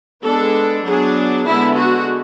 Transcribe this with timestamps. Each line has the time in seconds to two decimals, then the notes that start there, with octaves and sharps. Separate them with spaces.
0.24 G#3 B3 D4 A4
0.86 F#3 B3 D4 G#4
1.48 D3 G#3 B3 E4
1.80 F#4